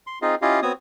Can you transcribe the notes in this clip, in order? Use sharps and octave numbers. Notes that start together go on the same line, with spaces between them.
C6
C4 D#4 F4 G#4 D#5 F5
C#4 E4 F4 G4 D#5 F5
B3 C4 F#4 C#5 D#6